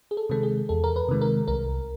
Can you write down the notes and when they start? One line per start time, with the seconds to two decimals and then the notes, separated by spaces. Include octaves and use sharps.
0.11 G#4
0.17 A4
0.30 C3 D#3 G#3 A4
0.43 G#4
0.69 E2 A4
0.84 A#4
0.96 B4
1.09 C3 D#3 G#3
1.21 A#4
1.48 C2 A#4